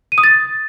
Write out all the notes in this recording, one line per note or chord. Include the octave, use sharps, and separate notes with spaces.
D#7
D#6
A6